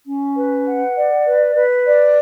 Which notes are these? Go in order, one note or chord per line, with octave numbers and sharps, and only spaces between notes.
C#4
B4
F#5
D5
B4
B4
D5